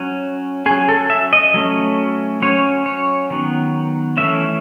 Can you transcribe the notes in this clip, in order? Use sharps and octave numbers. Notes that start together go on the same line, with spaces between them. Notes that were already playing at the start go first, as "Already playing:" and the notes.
Already playing: F#3 C#4
F#3 C#4 G#4
A4
E5
D#5
F#3 A3 C#4
F#3 C#4 C#5
C#5
D#3 F#3 B3
E3 A3 C#4 E5